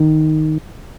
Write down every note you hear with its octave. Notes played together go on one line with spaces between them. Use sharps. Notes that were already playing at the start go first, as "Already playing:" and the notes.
Already playing: D#3